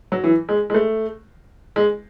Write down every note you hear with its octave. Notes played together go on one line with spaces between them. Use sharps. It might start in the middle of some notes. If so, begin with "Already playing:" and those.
F#3
E3
G#3
G#3
A3
G#3